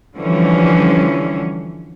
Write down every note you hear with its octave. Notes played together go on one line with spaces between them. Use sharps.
D3 E3 F3 G3 C#4